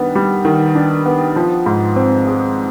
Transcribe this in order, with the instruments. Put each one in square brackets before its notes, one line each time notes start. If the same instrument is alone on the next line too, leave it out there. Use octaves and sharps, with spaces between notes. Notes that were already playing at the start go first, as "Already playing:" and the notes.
Already playing: [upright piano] D#3 G3 B3 D4
G3
D#3
D4
B3
F3
G#2
C4
G#3